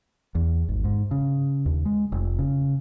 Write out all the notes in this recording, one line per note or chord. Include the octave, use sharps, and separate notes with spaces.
E2
G#1
G#2
C#3
D#2
G#3
F1
C#3